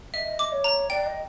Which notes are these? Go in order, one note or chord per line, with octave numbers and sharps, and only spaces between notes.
D#5 E5
D6
C#5
A#5
D5 G5
D#5